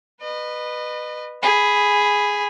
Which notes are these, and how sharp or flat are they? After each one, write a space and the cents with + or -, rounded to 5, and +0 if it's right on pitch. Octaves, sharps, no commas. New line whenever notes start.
B4 +0 D#5 -30
G#4 +0 B5 +5